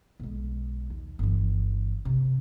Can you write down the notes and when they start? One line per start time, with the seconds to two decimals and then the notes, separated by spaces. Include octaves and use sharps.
0.20 B1 G#3
0.90 D#2
1.19 G1 E3
2.05 C3 C#4